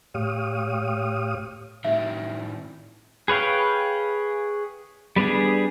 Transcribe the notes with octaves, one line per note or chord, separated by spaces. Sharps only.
A2 G4 C#5 F5 D#6
A2 D#3 E5
G#4 B4 C#5 F5 G5
G3 B3 D4 G#4